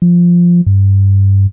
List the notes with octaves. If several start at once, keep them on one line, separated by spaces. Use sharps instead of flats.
F3
G2